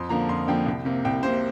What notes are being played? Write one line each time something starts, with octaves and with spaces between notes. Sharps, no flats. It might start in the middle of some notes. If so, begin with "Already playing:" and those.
Already playing: F2 C6
D3 F3 A#3 A#5
F2 C6
D3 F3 A#3 G5
C2
C3 A#3
C2 G5
C3 A#3 C5